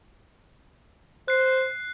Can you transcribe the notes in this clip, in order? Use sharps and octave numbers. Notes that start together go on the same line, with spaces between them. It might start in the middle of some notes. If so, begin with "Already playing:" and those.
C5 F#6 C7